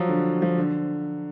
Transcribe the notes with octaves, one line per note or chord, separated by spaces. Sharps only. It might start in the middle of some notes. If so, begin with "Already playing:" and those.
Already playing: F3 F#3
D3
F3
D3